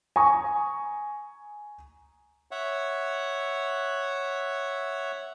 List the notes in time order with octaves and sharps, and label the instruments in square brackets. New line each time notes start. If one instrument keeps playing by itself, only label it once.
[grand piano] G#5 A#5 C#6 D#6
[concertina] C#5 E5 F#5